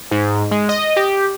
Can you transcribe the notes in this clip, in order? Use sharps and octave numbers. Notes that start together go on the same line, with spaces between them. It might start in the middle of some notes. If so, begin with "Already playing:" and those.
G#2
G#3
D#5
G4